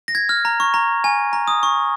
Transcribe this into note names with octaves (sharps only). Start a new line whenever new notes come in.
A#6
G#6
F6
A#5
C#6
A#5
G#5
A#5
D#6
C#6